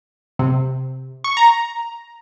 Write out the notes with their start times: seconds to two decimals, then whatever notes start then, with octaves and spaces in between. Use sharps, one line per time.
0.39 C3
1.24 C#6
1.37 A#5